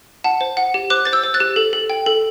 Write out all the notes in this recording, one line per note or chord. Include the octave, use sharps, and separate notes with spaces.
F#5 A5
C5
F#5
G4
C5 D6 F#6
C5 A6
E6 G6
C5
F#6 A6
G4
A4
A4
G5
A4